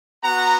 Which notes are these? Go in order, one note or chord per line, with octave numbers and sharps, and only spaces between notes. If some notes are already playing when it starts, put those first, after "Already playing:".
B3 F#4 F#5 A#5